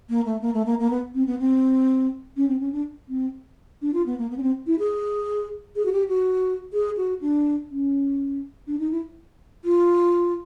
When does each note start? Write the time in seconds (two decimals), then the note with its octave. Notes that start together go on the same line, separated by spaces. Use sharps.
0.10 A#3
0.25 A3
0.42 A#3
0.54 A3
0.66 A#3
0.80 A#3
0.90 B3
1.14 C4
1.27 B3
1.39 C4
2.37 C#4
2.48 C4
2.60 C#4
2.72 D4
3.09 C4
3.82 D4
3.94 F4
4.06 B3
4.18 A#3
4.30 B3
4.37 C#4
4.42 C4
4.67 E4
4.79 G#4
5.76 G#4
5.86 F#4
5.92 G4
6.08 F#4
6.73 G#4
6.97 F#4
7.21 D4
7.71 C#4
8.67 D4
8.79 D#4
8.92 E4
9.65 F4